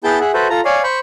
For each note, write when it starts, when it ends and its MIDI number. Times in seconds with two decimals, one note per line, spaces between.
0.04 0.19 59
0.04 0.19 64
0.04 0.19 68
0.04 0.19 79
0.04 0.19 81
0.04 0.19 91
0.21 0.32 68
0.21 0.32 76
0.21 0.32 78
0.34 0.48 66
0.34 0.48 69
0.34 0.48 71
0.34 0.48 72
0.34 0.48 76
0.50 0.61 65
0.50 0.61 69
0.50 0.61 82
0.65 0.82 73
0.65 0.82 74
0.65 0.82 77
0.65 0.82 80
0.84 0.99 72
0.84 0.99 83
0.84 0.99 85